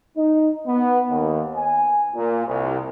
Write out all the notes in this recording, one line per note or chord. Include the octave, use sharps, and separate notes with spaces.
D#4
B3
D#2
G#5
A#2
C2